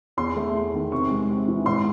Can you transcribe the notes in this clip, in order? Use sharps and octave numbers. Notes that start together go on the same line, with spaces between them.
E2 C6
A3
E2
D#3
C3 C#6
G#3
C3
E3
G#2 C6